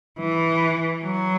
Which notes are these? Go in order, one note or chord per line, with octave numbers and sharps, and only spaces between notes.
E3
F#3